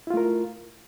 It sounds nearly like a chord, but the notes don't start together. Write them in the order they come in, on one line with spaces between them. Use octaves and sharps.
E4 F4 A3 A#4